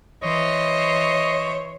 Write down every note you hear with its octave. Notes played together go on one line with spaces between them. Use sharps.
E3 C5 C#5 D#5